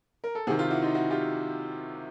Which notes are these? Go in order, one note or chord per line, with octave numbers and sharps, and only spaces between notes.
A#4
A4
C3 D#3 F#4 G#4
F4 G4
E4 F#4
D#4 F4
E4 F#4
F4 G4